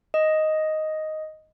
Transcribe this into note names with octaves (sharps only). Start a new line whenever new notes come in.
D#5